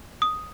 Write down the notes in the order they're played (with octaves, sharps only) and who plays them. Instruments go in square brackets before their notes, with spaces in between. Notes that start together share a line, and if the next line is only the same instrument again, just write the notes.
[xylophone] D#6